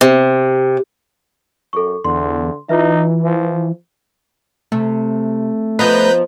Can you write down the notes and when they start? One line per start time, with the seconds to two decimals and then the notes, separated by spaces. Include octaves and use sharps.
0.01 C3
1.73 F#2 A4 C#6
2.05 E2 D3 C6
2.69 E3 D#4 F4 B4 E5
3.22 F3
4.72 C3 A3
5.79 F3 B3 D#4 B4 A#5 G6